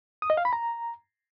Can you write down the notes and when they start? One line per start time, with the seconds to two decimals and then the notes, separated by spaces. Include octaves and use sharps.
0.22 D#6
0.30 D#5
0.37 F5
0.45 B5
0.53 A#5